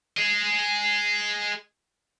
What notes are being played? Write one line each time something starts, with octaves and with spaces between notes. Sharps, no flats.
G#4 D#5